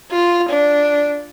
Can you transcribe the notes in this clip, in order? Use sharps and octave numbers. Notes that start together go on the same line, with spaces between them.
F4
D4